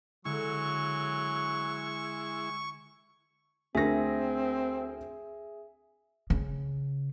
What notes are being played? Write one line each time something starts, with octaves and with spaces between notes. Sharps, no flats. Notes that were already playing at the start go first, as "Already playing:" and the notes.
D3 F#3 G#3 E4 C#6
D2 C4 G#4 A#4 E5 G#5 A#6
C#3